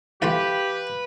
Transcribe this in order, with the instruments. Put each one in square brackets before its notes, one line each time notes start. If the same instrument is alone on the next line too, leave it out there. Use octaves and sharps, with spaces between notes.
[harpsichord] E3 A3 F4 [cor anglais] G4 [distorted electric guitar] B4 [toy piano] F5